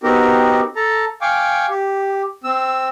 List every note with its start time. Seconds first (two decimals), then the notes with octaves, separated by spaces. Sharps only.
0.03 B3 C4 D#4 F#4 G4 A#4
0.76 A4 A5 A#5
1.21 F5 G5 G#5 C#6 D6
1.70 G4
2.44 C4 E6